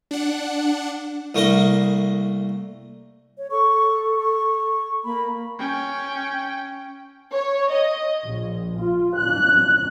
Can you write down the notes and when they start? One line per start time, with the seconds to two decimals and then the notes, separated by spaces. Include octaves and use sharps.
0.11 D4 F#5
1.35 C2 A3 A#3 D#5
3.38 C#5
3.51 A4 C#6
4.17 C#6
5.04 A#3 B5
5.59 C#4 G5
7.32 C#5
7.72 D#5
8.24 A#1
8.79 F4
9.16 F#6